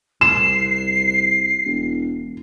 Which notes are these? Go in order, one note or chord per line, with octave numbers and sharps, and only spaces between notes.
C2 C7 E7
E1